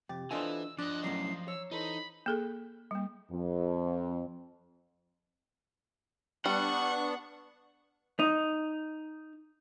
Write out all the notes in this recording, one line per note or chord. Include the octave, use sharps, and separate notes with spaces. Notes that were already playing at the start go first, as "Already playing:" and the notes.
F2 C3 G4 A6
E3 D4 F4 A4 C5 D#5 G#5 E6
F3 D4 D5 D#5 F#6
A2 F#3 C#4 D5 A#5 C7
C#5 E6
E3 D#4 A4 C5 B5
A#3 G#4 A4
G3 A#3
F2
G3 B3 D4 F#5 C#6
D#4